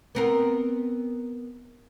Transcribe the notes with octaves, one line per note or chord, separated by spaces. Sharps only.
B3 C4 A#4